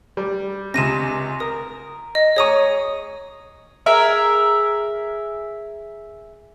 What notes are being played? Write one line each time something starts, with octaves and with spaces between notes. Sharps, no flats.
G3
C#2 C3 A#6 D#7 E7
A#4 D#6
D#5
G#4 C#5 A#5 C#6 D#6 D#7
G#4 A#4 E5